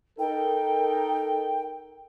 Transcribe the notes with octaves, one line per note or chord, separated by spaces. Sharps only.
D#4 A4 A#4 G5